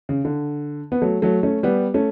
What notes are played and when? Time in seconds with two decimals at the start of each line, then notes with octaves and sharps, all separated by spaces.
0.09 C#3
0.25 D3
0.92 B3
1.02 F#3 A3
1.22 F#3 A3
1.43 A3 C#4
1.63 G3 B3
1.94 A3 C#4